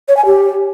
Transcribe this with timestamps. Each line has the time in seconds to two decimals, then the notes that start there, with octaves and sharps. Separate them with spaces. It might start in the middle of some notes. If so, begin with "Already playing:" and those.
0.08 C#5
0.17 G#5
0.25 G4